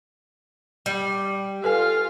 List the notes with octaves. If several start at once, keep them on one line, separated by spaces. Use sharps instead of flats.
G3
F4 A4 B4 F5 G#5